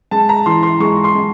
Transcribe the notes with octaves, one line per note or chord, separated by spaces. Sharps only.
G#3 A5
A#5
E3 C6
C6
G#3 C#6
C6
G#3